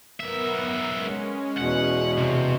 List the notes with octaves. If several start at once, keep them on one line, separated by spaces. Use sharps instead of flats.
B1 B3 A#4 E5
F#5
G#3 C#4
E2 B2 F#5
C3